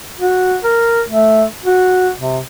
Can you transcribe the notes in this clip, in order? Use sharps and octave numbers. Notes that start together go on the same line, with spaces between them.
F#4
A#4
A3
F#4
C3